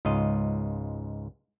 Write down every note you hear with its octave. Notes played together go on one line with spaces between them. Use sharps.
C#2 G#2 F4 D#5